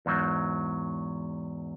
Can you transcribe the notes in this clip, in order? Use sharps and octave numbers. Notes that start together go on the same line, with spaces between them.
E2 G#2 F#3